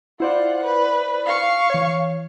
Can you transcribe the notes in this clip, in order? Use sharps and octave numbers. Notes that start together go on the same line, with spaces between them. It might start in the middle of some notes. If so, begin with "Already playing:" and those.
E4 F4 C5 D5 F#5
B4
F5 C#6
E3 C#5